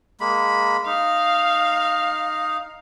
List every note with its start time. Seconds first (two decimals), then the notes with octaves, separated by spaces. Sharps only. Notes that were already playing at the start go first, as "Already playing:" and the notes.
0.20 G#3 A#3 B5
0.86 D#4 F5